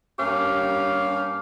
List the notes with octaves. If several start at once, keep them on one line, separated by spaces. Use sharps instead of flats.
G2 A#3 C#4 G4 F5